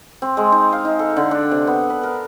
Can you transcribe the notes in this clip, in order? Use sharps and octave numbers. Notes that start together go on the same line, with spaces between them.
C4
G#3
D#4
F5
D#4
A4
D3
D4
C3
B3
B4
A#4